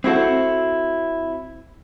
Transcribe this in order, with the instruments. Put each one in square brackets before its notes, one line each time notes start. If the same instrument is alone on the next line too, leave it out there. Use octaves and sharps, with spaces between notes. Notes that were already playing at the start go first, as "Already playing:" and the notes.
[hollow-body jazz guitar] C4 E4 F#4 A4